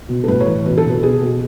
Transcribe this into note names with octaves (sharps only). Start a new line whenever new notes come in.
B2
A4
A2 B4
C#5
E3 B4
B2 B4
A4
B2
B4
B2 G#4
B2